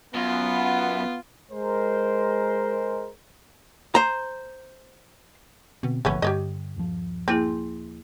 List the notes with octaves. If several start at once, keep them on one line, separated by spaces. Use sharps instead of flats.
F#2 B3 F4
G#3 A#4 C5
C5 A#5
B2 D3 C4
G#1 A#2 D3 F3 A3 B3 C#4
G2 D3 G4 C#5 D#5
D#1 F3
A#3 C4 E4 G#4